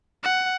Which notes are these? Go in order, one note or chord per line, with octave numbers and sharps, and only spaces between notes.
F#5